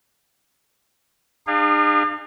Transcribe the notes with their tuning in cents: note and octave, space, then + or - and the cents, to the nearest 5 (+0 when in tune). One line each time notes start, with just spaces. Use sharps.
D4 +45 G#4 -40 F5 +0